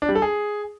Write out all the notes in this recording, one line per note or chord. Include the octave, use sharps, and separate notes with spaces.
D4
G3
A4
G#4